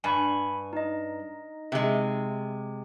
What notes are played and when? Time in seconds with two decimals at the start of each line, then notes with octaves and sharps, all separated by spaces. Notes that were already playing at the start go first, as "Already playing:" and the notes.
0.04 G2 G#5 B5 C#6
0.73 D#4 D#5
1.72 C3 G#3